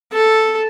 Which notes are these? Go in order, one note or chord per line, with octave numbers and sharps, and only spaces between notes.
A4